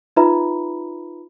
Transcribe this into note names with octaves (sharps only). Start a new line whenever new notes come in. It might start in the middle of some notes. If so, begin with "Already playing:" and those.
D#4 F4 B4 E5 A#5 B5